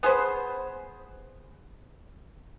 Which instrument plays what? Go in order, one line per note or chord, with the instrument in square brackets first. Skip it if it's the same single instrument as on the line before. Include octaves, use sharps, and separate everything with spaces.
[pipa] B3 G#4 B4 C5